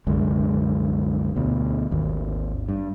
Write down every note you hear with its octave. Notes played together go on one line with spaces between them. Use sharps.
C2 F#2 D3 G#3
D2 B2
G#1 D#2
G2